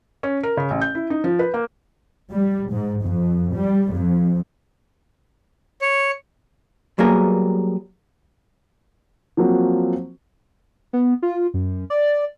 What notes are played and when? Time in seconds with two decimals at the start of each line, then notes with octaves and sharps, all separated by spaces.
0.23 C#4
0.43 A#4
0.57 C#3
0.70 A1
0.81 G6
0.95 E4
1.10 D#4
1.24 F3
1.39 B4
1.54 A#3
2.32 G3
2.72 G#2
3.02 F2
3.54 G3
3.94 F2
5.81 C#5
6.99 F#3 G3 A#3 B3 G#4 A#4
9.37 F3 F#3 A#3 C4 F#4
10.93 B3
11.22 F4
11.54 F#2
11.90 D5